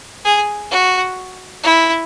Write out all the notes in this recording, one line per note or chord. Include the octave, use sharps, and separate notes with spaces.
G#4
F#4
E4